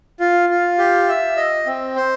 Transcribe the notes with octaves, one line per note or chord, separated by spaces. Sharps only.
F4
F4
G4
E5
D#5
C4
C5